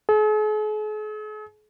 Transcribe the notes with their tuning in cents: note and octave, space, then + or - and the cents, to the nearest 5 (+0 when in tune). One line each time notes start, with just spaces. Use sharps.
G#4 +45